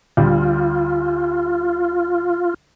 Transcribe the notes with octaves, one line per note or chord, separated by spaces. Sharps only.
D2 G3 F4